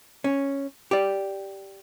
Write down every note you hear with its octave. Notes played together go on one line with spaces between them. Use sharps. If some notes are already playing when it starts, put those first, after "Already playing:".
C#4
G4 D5